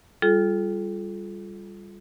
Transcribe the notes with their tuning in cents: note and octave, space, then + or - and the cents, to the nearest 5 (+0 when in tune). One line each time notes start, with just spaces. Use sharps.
G3 +10 F4 +0 A4 -40